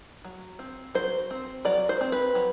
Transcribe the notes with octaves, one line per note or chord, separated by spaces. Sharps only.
F#3
C4
F#3 C5
C4
F#3 D5
C5
C4
B4
F#3